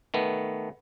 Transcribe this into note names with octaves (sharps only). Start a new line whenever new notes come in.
D#3 A3 B3